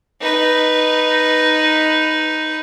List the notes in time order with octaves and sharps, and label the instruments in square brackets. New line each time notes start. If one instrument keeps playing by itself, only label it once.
[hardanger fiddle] D#4 B4